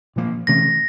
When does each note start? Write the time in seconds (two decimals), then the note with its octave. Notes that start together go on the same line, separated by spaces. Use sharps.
0.16 A#2 F3 A#3
0.47 C3 E3 A3 C#4 A#6